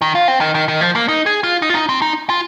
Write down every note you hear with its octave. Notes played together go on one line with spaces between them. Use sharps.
D#3
F4
C4
D#3
D#3
D#3
F3
A#3
D#4
G#4
F4
D#4
F4
D#4
C4
D#4
F4